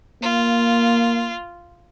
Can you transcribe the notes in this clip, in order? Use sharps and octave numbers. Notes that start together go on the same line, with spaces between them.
A#3 F4